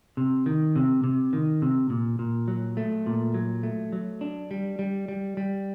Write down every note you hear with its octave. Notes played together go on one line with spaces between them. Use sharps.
C3
D#3
C3
C3
D#3
C3
A#2
A#2
F#3
A3
A#2
F#3
A3
F#3
D4
G3
G3
G3
G3